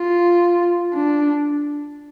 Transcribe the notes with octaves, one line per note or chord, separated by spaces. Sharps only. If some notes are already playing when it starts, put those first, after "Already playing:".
Already playing: F4
D4